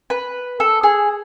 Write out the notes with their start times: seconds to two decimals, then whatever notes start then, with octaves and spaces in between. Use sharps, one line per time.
0.10 B4
0.60 A4
0.83 G#4